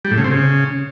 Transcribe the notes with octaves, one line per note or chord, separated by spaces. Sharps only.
G3
A2
C#3
C4
C#3